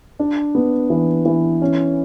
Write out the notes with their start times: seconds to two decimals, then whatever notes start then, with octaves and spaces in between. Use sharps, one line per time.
0.19 D4
0.55 B3
0.90 E3
1.25 E3
1.62 C#4